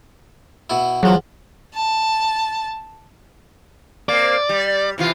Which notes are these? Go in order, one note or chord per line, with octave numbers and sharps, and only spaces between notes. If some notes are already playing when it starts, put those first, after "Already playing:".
B2 E4
E2 F3 F#3
A5
A#3 C4 D5
G3
C3 E3 F4